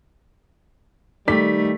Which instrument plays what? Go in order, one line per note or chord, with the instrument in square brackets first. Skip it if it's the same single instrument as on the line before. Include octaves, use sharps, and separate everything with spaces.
[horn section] D#3 G3 [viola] A3 [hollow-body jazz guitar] D#4 A4 D5 [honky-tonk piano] B6